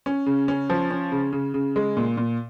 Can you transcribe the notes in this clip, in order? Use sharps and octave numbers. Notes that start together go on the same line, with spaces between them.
C#4
C#3
C#4
F3
C#4
C#3
C#3
C#3
G#3
A#2
A#2